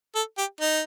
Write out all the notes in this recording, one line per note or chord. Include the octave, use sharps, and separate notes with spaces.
A4
G4
D#4